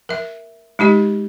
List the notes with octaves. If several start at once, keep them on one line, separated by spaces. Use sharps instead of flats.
A#4 E5
G#3 D#4 G4 D#5